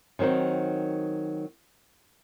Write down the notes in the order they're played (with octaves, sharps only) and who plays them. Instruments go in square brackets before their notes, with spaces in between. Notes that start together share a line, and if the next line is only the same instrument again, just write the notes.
[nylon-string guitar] D#3 F#3 C4 D#4 F#4